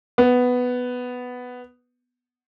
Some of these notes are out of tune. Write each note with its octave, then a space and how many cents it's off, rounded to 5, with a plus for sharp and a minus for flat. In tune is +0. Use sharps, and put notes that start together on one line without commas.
B3 +5